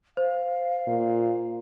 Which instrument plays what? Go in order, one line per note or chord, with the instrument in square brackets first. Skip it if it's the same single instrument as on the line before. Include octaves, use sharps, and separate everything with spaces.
[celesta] C5 [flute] F5
[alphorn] A#2